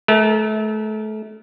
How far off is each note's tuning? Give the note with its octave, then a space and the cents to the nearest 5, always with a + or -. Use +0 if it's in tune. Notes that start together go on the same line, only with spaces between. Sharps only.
A3 -30 A#4 +0